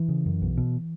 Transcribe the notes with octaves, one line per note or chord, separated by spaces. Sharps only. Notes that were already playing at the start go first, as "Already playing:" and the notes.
Already playing: E3
C#3
F#2
B1
B2